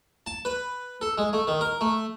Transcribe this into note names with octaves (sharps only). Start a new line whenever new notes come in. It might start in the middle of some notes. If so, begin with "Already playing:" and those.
A5
B4
A4
G#3
A3
D#3
A#4
A3